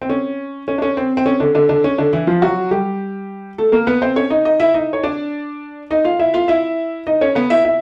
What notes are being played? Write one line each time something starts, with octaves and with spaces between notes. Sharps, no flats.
C4
C#4
C#4
D4
C#4
C4
C4
C#4
D3 D4
D3 D4
D3 D4
C#4
D3 D4
E3 E4
F3 F4
F#3 F#4
G3 G4
A3 A4
A#3 A#4
B3 B4
C4 C5
C#4 C#5
D#4 D#5
D#4 D#5
E4 E5
D#4 D#5
C#5
D4 D5
D#4 D#5
F4 F5
E4 E5
F4 F5
E4 E5
D#4 D#5
C#4 C#5
B3 B4
E4 E5
E4 E5